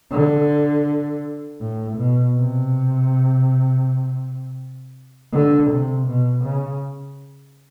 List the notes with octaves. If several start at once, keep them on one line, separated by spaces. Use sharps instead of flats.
D3
A2
B2
C3
D3
C3
B2
C#3